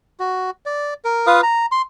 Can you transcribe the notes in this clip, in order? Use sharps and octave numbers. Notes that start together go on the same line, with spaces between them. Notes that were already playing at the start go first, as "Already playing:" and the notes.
F#4
D5
A#4
F4 B4 F5 D#6
A#5
C6